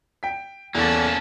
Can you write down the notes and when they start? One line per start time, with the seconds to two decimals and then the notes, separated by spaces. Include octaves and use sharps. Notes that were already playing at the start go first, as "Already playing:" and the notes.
0.23 G5 B6
0.75 E2 A#3 C#4 A4 A5 E6 F#6 A6